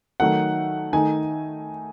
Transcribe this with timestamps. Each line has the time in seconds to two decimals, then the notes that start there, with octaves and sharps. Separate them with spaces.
0.20 D#3 F#3 A3 D#4 F#5
0.93 D#3 A3 D#4 G#5